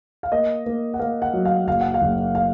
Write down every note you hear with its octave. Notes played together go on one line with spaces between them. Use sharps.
F5
A#3 D#5
A#3
F#5
A#3 F5
F#5
F#3
F5
F#1 F5
F#5
F5
F#1
F5